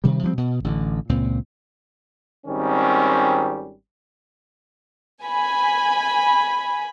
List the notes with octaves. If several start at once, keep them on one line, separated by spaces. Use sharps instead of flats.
C3 D#3 G3
F3 G3 A#3 C4
B2
A1 D3
C#2 A#2 C4
G#1 D#3 G3 C4 C#4
G#5 B5